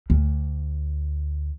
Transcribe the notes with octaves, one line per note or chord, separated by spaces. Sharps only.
D2